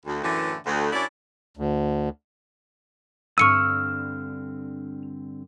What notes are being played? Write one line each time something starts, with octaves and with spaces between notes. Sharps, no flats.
D2
F#2 A2 D3 E3
D2
F#2 C#4 D4 E4 D5
D2
G2 D3 C4 C#6 E6 F6 C#7 D#7